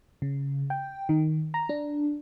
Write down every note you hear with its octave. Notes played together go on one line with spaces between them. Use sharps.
C#3
G5
D#3
A#5
D4